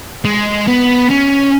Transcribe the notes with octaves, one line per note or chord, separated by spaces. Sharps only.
G#3
B3
C#4